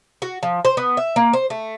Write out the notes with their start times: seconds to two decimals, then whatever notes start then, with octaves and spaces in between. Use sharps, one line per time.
0.22 F#4
0.43 F3
0.65 C5
0.77 B3
0.97 E5
1.16 A#3
1.33 C5
1.50 A3